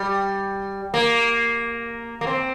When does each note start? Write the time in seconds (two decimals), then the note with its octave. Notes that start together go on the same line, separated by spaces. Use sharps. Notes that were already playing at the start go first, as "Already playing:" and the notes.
Already playing: G3
0.94 A#3
2.21 A#3
2.27 C4